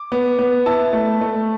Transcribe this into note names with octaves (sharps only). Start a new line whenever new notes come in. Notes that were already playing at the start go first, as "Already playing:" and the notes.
Already playing: D6
B3
B3
E4 A5
A3
A3